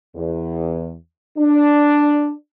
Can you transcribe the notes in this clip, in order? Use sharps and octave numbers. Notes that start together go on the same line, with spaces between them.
E2
D4